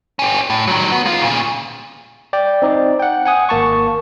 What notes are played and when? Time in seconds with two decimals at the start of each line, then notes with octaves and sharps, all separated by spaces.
0.19 C#4 G4
0.50 A2
0.67 D#3 F#3
0.92 B3
1.05 G#3 F4
1.22 A#2 C#3
2.33 D5 G5
2.62 C4 D#4 D5
3.00 F#5 G5
3.26 F#5 G#5 D#6
3.49 G#1 A#3 A5 C#6